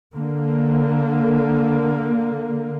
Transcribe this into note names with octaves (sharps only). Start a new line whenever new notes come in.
D3 A#3